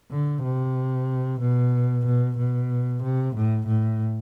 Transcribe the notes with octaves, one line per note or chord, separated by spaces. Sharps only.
D3
C3
B2
B2
B2
C3
A2
A2